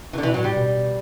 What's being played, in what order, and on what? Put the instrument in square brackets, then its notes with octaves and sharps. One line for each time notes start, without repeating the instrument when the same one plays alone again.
[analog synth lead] C3 [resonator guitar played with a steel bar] E3
[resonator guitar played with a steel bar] D3
[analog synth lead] B2 [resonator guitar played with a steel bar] E3
[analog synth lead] A2 [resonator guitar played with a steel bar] F#3
[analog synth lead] A2 [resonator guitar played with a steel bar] G3
[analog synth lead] B2